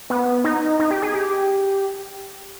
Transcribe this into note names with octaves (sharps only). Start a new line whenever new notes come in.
B3
D#4
D#4
G4
G#4
G4